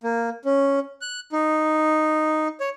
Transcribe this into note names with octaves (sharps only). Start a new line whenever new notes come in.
A#3
C#4
F#6
D#4
C#5